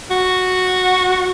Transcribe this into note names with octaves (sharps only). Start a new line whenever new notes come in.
F#4